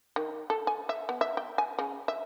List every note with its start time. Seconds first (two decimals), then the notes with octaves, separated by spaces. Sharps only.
0.16 D#3
0.50 A4
0.67 G#5
0.89 E5
1.09 B3
1.21 E5
1.37 G5
1.58 G#5
1.79 C#3
2.08 E5